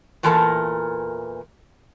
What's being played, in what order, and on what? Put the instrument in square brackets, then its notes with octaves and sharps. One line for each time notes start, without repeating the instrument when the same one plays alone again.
[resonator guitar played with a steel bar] E2 A#2 E3 A4 A#4 A5